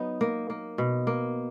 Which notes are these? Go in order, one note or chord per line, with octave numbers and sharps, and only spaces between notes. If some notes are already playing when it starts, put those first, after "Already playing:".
Already playing: F#3 B3 D#4
A#3
A#3
B2
A#3